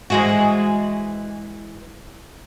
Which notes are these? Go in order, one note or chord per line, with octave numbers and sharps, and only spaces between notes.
E3 G#3 F#4